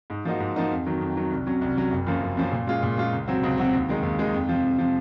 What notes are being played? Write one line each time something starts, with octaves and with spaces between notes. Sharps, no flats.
G#2
F3 A#3 D#4 F#4
G#2
F3 A#3 D#4 F#4
F2
D#3 F#3
F2
D#3 F#3
C2
C3 F#3 C#4
C2
C3 F#3 C#4
F#1
F#2 F3 A#3 C#4
F#1
F#2 F3 A#3 C#4
A#2
G#3 C#4 F4
A#2
G#3 C#4 F4
C#2
C3 F#3 C4 F#4
C#2
C3 F#3 C4 F#4
D#2
D#3 G#3 D#4
D#2
D#3 G#3 D#4
F2
C3 F3
F2
C3 F3